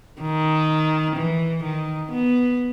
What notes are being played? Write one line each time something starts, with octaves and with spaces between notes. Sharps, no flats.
D#3
E3
D#3
B3